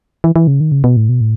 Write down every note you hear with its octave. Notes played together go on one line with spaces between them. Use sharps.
E3
E3
C#3
D#3
C#3
B2
A2
B2
A2